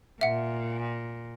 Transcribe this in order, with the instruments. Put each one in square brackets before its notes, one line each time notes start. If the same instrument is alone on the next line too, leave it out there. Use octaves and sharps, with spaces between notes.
[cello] A#2 [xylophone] E5 F#5